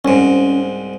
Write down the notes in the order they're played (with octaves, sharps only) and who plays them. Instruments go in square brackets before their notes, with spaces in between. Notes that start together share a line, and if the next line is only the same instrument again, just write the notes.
[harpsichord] C2 G#2 [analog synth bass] C#4